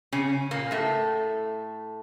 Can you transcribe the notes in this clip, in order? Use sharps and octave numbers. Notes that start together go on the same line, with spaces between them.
C#3 C#4
A#2 A#3
A2 A3